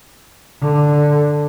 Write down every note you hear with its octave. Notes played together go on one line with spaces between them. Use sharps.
D3